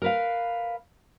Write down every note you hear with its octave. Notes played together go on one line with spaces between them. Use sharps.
A#4 B4 F5